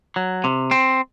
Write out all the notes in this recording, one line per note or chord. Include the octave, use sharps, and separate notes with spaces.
F#3
C3
C4